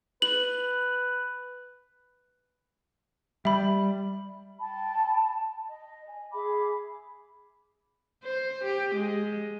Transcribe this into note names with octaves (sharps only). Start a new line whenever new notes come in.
B4 F#7
G3 E5 B5
G5 A5 B5
D#5
G#5
G#4 E5 B5 D6
C5
G4
G#3